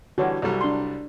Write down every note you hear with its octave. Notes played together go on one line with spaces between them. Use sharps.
D3 E3 G3 F#4 C#5 F#5
C2 F#3 G3 A4 D5
D4 C6